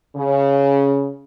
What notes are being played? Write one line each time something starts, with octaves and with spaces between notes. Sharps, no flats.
C#3